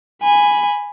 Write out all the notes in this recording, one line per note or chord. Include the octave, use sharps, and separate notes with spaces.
G#5 B5